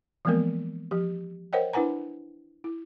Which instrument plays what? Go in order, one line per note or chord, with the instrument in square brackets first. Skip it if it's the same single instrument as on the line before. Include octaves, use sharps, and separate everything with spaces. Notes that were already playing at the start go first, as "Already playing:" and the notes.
[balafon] E3 F3 G#3 A#3 B3 A#4
F3 G4
A#4 C5 C#5 D#5 F#5 G5
D4 E4 B4 F#5 G#5 A#5
E4